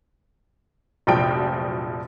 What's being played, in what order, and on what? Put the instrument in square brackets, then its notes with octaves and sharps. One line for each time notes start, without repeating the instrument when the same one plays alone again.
[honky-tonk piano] F1 A#1 F3 F#3 G5 D7